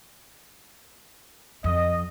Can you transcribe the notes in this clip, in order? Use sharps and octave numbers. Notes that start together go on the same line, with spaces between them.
F2 D#5